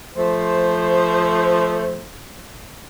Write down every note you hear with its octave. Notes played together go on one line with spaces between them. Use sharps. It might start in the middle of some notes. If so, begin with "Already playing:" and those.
F3 A3 C5